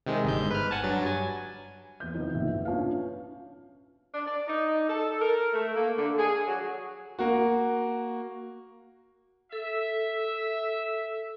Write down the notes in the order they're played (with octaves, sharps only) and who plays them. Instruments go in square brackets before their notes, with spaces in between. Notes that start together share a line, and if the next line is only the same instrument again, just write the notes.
[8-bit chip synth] C3 D#3 G#3
G1 G#2 G6
B4 F6
F#5 G#5 A5
G2 F#3 A6
G#5
[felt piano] E2 B3 G6
C3 D#3 F3 B3 D#4 E4
F#1 B1 G#2 E5
E5
C#4 D4 F4 B4 F5
[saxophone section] D4
D5
D#4
A4
A#4
A3
A#3
D3
G#4
F#3
[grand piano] A#3 F#4
[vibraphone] A4 [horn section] E5